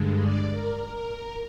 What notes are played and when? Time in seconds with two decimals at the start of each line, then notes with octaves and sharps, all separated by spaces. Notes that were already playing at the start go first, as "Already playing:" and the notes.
Already playing: G2 D3 G#3
0.23 D5
0.51 A#4
0.94 A#4